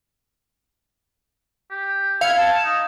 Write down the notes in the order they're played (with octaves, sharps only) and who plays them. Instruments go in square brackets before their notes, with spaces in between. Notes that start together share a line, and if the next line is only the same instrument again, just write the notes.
[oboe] G4
[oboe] E4 [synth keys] F5 G#6 C#7
[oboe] A5
D#4